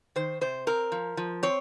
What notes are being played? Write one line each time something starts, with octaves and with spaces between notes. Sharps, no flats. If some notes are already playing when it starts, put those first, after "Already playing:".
D#3 C5
C3 C5
C4 A#4
F3
F3
C4 C#5